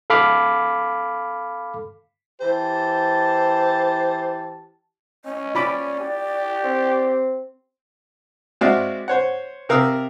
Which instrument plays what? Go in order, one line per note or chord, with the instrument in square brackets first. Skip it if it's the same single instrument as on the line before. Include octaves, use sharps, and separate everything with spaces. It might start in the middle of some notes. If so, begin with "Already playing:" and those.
[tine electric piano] A4 F5 B5 D6 F6
[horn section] E3 G4 A5 [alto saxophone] C5
[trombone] C#4 [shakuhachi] D#5
[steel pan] F4 B5 D6 [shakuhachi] D5
[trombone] G4
[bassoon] C4
[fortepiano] G#3 C4 F#4 D5 E5 F5
C5 C#5 F#5
C3 A#4 F5 D#6 E6